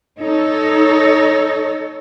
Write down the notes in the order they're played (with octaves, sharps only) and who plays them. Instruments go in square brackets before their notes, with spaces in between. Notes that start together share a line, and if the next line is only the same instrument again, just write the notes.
[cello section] D#4 A4 C#5